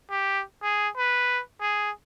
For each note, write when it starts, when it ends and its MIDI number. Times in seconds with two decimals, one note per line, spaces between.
0.11 0.43 67
0.62 0.89 68
0.98 1.41 71
1.61 1.91 68